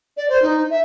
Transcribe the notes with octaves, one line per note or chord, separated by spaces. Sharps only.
D5
C5
D#4
E5